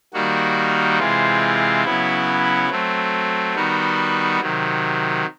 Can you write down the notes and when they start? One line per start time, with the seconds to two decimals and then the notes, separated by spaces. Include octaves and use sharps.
0.14 D#3 G3 A#3 D#4 F#4
0.99 C3 E3 G#3 C4 F4
1.84 C#3 F#3 B3 E4
2.69 F#3 A3 C4
3.55 D#3 G3 B3 D#4 F#4
4.41 C3 D#3 F#3